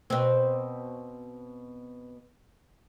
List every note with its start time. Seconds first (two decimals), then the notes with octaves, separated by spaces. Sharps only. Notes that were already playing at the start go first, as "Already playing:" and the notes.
0.10 B2 C4